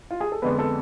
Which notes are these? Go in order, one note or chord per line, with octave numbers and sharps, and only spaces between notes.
F4
G#4
A4
F2 D3 G#3 B3 B4
A4